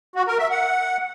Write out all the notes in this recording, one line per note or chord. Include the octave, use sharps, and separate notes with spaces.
F#4
A#4
E5
F#5